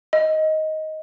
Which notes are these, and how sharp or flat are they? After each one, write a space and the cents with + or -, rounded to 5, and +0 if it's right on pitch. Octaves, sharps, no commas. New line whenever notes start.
D#5 +10